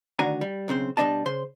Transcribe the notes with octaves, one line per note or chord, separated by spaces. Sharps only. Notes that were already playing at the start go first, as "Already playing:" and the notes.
D2 D#3 D4 F#4 G#5 A#5
G3
B1 C#3 C4 C5
B2 G3 G#3 D4 D#5 A5
C#3 C5 C6